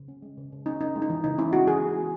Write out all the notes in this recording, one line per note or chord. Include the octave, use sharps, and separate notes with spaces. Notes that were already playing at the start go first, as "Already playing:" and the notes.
Already playing: C#3
C#4
G#3
C#3
C#3
C#4 D#4
C#4 D#4
G#3
D#4
E3
C#3 D#4
C#4 E4
G#3 F#4
E3 G#4
B3
G#3